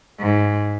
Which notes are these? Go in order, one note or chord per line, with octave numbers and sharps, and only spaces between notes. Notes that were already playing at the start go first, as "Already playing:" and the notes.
G#2